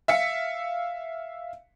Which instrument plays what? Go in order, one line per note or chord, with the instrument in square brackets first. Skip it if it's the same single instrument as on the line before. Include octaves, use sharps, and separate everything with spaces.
[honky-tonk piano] E5 F5 B6 C#7